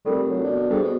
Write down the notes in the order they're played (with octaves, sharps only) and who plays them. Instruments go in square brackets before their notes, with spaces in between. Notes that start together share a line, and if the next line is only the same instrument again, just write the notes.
[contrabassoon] F1 [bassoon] G3 [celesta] G4 A4 A#4
[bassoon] F#3
[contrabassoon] B2 [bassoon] D4
[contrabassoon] G2 [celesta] G#4 A4 C5
[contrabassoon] B2